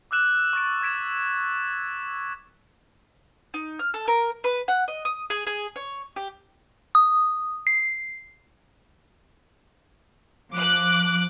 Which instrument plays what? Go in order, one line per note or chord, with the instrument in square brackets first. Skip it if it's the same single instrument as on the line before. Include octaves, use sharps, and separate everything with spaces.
[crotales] D6 E6 F#6 E7 F#7
C#6 F#6 A6 D7
D6 G#6 B6 D7 E7
[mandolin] D#4
F6
A4
A#4
B4
F#5
D#5
D#6
G#4
G#4
C#5
G4
[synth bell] D#6
C7
[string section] F3 D6 F#6